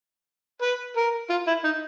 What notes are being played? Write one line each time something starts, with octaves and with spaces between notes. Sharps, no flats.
B4
A#4
F4
E4
D#4